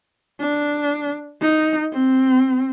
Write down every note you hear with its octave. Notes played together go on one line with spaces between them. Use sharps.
D4
D#4
C4